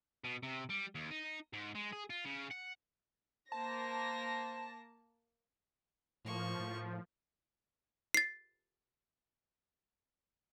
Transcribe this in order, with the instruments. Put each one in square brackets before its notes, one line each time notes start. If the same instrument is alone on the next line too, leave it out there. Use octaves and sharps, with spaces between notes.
[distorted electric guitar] B2
C3
G3
D#2
D#4
G#2
G#3
G#4
F4
C#3
F#5
[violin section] A#3 A#6 [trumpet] C5 [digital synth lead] A5
[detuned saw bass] A2 [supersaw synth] F3 [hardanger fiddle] A#3 C#6
[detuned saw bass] A2
[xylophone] A6 C7